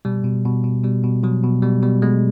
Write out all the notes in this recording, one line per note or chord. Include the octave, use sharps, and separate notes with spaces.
B2 G3
B2
B2
B2
B2 G3
B2
B2 F#3
B2
B2 G3
B2 G3
B2 G#3